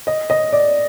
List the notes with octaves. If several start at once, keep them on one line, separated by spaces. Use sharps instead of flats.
D#5
D#5
D5